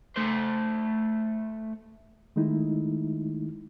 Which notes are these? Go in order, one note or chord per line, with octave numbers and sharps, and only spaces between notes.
A3 C5
D#3 G#3 A3 D#4 E4